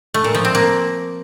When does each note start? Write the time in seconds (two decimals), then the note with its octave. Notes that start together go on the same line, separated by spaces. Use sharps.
0.14 A3
0.24 A#2
0.35 F3
0.45 C4
0.55 A#3